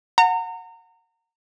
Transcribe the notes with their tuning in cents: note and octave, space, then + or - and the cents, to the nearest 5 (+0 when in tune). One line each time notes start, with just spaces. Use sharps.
F#5 -15 A#5 -30